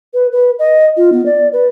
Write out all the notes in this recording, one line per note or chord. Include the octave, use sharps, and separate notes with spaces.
B4
B4
D#5
F4
B3
D5
B4